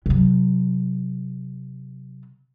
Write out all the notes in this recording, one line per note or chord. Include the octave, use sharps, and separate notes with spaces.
C3 F#3